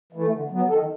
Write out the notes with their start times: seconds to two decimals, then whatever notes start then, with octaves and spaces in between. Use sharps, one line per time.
0.13 E3 A3
0.31 D3
0.50 F#3 B3
0.68 D#3 A4